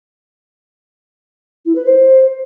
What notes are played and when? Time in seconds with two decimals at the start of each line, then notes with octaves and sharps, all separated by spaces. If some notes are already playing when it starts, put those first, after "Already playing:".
1.65 E4
1.75 B4
1.85 C5